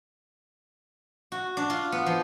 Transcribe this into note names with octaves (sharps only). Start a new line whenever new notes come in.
F#4
D4
F4
B3
F3